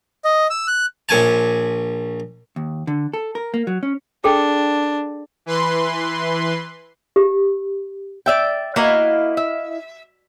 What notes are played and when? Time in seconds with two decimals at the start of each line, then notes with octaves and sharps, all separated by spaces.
0.24 D#5
0.50 E6
0.68 F#6
1.09 A#1 C#4 G#5 A5
2.56 D#2
2.87 D3
3.14 A4
3.35 A#4
3.54 A#3
3.67 F#3
3.83 C#4
4.24 D4 G#4 A4 G5
5.46 E3 B4 C6
7.16 G4
8.26 D5 E5 G5
8.76 A#3 E4 F#4 D#5 F5
9.37 E5